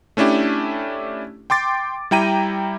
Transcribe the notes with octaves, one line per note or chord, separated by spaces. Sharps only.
A3 C#4 D4 E4 G4
G5 C6 D6 A6
G3 E4 G5 A#5 D#7